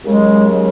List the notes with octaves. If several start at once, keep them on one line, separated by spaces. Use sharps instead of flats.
D#2 C#3 F#3 G#3